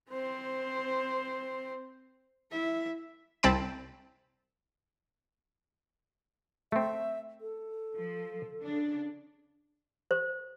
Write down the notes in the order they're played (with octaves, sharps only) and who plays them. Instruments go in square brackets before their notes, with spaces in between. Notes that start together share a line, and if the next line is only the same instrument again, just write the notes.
[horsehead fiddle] C4 C5
E4 E5
[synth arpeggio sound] C2 C4 A5 B5 D7
[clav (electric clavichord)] A3 C4 [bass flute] E5
[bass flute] A4
[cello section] F3
C#3 D4
[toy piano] C5